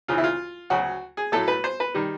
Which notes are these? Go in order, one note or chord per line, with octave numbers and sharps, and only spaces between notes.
D2 C#3 E3 F4
E4
F4
D2 C#3 F#3 F#4
G#4
A2 F#3 A3 A4
B4
C5
B4
D#3 G3